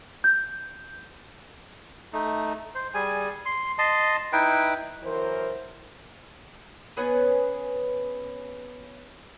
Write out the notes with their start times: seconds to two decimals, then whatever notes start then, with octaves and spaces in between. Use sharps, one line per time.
0.24 G6
2.13 A3 D#4
2.75 C5
2.94 G3 G#4 G#5
3.46 C6
3.78 D#5 A5 C6
4.33 D#4 E4 B4 G5
5.04 E3 F#3 A#4 C5
6.97 B3 C#4 G#4 B4